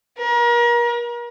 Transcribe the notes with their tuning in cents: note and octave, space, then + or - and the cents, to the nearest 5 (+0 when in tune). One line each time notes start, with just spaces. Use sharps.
A#4 +35